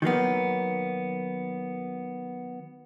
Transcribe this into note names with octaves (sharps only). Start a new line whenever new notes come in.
D#3 F#3 A#3 B3